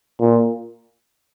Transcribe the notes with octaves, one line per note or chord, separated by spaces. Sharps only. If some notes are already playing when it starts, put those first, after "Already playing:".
A#2